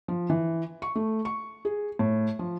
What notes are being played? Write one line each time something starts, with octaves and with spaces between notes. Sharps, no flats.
F3
E3
C#6
A3
C#6
G#4
A2
F3